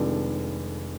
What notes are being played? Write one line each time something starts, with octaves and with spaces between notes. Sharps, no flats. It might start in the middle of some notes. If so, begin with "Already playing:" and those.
Already playing: F1 F2 D#3 G#3 D4